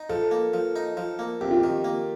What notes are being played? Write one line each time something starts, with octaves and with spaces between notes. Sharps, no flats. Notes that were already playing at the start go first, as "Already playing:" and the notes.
Already playing: D#4
F3 A4
A#3
F3
D#4
F3
A#3
F2 G4
F4
D#3 G4
A#3